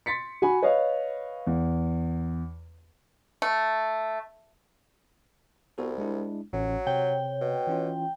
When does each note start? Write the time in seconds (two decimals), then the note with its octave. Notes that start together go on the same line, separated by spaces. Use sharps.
0.06 C6 A6 B6 C#7
0.42 F#4 G#5 B5
0.62 B4 C#5 D#5 F5
1.47 E2
3.42 A3
5.78 C2 B3 F#4 A4
5.98 G#3 D4 E4
6.53 A1 F#3 C#4
6.87 C3 C5 C#5 G5
7.41 B2
7.67 E3 C#4 F4